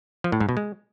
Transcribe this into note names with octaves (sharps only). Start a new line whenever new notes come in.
F3
A2
G#2
B2
G#3